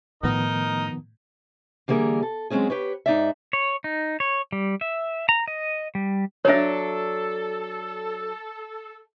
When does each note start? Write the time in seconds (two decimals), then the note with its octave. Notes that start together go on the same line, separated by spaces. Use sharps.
0.23 A2 D#3 F3 B3 D#4 A#4 D#5
1.88 D3 E3 G3 A#3 G#4 A#4
2.22 A4
2.50 F#3 G#3 A3 C4 C#4 G#4
2.70 G4 B4 C#5
3.06 G#2 D#4 D5 E5
3.53 C#5
3.84 D#4
4.20 C#5
4.52 G3
4.81 E5
5.29 A#5
5.48 D#5
5.95 G3
6.45 F#3 D4 A4 C#5 E5